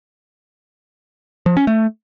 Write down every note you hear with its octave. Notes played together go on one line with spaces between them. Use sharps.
F3
C#4
A3